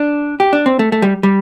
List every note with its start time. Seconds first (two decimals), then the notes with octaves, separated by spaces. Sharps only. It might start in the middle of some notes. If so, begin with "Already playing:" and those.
Already playing: D4
0.40 G4
0.53 D4
0.66 C4
0.79 A3
0.92 A3
1.02 G3
1.23 G3